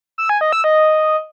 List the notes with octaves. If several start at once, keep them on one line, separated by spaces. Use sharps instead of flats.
E6
G#5
D#5
E6
D#5